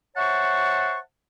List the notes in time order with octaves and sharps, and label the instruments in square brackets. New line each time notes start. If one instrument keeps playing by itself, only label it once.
[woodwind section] C5 C#5 E5 F#5 A5 C#6